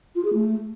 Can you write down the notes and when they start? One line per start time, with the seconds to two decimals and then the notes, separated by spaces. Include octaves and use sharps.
0.16 F4
0.25 G#4
0.34 A3